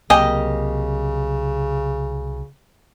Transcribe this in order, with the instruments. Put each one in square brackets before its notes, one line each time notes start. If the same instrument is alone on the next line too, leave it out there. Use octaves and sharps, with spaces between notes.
[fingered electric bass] C2 F#3 C4 [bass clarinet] C#3 [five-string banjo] A#3 G4 G#5 [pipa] D#5